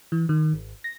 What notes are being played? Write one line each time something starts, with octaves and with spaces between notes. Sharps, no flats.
E3
D#3
G#1
A#6